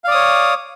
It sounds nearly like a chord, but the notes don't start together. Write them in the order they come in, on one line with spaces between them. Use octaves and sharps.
F5 D5 D#6 C#5